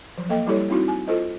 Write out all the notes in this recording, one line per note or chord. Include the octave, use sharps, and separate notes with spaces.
F3 F#3
A#3 A4 D#5 G5
G3 E4 G4 A4 C#5
C4 D#4 E4 F#4
G#5
F4 A4 C5 D#5